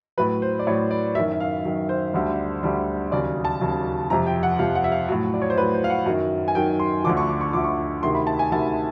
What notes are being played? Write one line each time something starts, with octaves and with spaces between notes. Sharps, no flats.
A2 F#3 B4
C5
D5
A2 F#3 C#5
D5
F#2 D#3 F#3 E5
E5
F5
F#2 D#3 F#3
C5
D2 D3 G3
D2 D3 G3
D#2 C#3 F#3 D5
A5
D#2 C#3 F#3
F2 C3 F3 A#5
G5
F#5
F2 C3 F3 F5
F#5
E5
F5
A2 F#3
D5
C#5
C5
A2 F#3 B4
C5
F5
F#5
F#2 D#3 F#3
G#5
F#2 D#3 F#3 G5
C6
D2 D3 F3 D6
C#6
D6
C#6
D2 D3 F3 D6
C#6
D2 C3 D#3 C6
B5
A5
G#5
D2 C3 D#3 A5